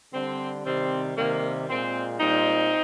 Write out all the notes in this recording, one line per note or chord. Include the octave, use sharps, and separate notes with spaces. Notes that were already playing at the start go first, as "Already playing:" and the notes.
D3 G3 C4
C3 D#3 G3 C4
C3 D#3 G3 A#3
A#2 G#3 C4
A#2 G3 C4 D#4